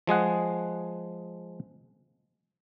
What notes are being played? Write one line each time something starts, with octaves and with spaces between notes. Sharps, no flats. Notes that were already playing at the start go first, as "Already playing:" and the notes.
F3 G#3 G#4 F#5